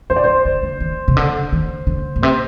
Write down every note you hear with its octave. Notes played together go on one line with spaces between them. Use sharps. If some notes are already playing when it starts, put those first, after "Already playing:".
D3 C5
D5
D3 C5
D3
D3
D#3
C3
D3
D#3
D3
A#2
C3 C5